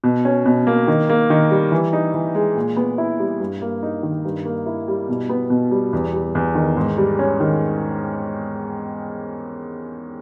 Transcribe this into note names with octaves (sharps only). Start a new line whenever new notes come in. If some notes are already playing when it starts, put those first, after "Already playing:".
B2
C#4
B2
A#3
D#3
A#3
D#3
G3
E3
D#4
E3
G#3
A#2
B3
E4
G3
G2
A#3
D#4
D#3
G2
A#3
E4
G3
B2
B3
B2
G3
E2
G3
E2
D#3
G#2
G3
C#4
D#3